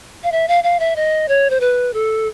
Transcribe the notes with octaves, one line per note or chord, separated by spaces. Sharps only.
F5
E5
F5
F5
E5
D#5
C#5
C5
B4
A4